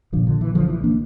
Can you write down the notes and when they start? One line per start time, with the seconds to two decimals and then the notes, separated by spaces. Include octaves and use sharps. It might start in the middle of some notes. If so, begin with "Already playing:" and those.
0.12 A#1 A#2 D3 F3
0.27 D3
0.41 E3
0.55 D3 F3
0.69 E3
0.84 A#3 D4